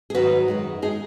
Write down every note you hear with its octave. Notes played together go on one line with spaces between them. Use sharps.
G#4
G#2 D#3 F#3 F#4 B4
F#2 D#3 G#3
G#3 D#4 G#4